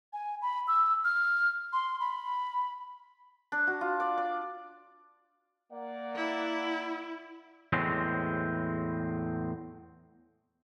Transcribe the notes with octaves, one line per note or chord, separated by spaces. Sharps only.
G#5
B5
E6
F6
C6
B5
D4
F#4
F4
D5
D5
A#3 D5 F#5
E4
E2 A2 F#3 G#3 C4